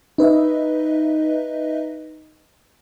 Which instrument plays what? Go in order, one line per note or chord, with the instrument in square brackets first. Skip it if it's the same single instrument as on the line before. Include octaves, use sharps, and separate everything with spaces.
[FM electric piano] D#4 B4 D#5 E5